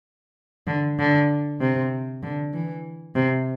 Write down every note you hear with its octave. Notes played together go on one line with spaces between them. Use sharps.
D3
D3
C3
D3
E3
C3